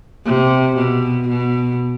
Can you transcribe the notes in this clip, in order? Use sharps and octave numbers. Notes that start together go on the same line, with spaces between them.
C3
B2
B2